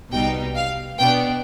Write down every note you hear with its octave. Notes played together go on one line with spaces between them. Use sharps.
C2 B2 G3 B3 D#4 G5
F5
B2 B3 D4 G5